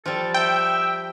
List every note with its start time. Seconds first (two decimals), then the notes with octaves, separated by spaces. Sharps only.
0.06 F3 G3 A4
0.34 E5 G5